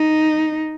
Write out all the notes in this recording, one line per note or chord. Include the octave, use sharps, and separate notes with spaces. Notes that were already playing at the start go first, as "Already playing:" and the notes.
Already playing: D#4